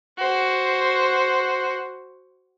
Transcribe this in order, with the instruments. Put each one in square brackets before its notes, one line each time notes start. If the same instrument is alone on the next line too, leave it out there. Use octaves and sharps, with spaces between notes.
[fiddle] F#4 C5